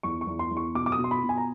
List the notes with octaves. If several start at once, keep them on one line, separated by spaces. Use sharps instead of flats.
E2 C#6
C#6
E2
C6
E2
C#6
B2 D6
D6
D#6
B2
C6
B5
B2
G#5
A#5